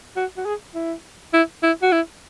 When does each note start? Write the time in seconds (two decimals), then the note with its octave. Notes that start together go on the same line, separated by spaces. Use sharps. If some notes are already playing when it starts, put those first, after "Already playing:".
0.16 F#4
0.37 F#4
0.45 G#4
0.75 E4
1.33 E4
1.63 E4
1.82 F#4
1.92 E4